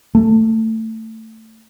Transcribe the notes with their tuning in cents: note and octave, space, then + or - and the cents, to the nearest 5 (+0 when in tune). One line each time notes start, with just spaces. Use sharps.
A3 +20